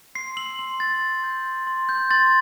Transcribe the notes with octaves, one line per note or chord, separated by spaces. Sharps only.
C6 C7
E6 F#7
C6 F#7
C6 A6
C6
G6
C6
C6
G6
C6 A6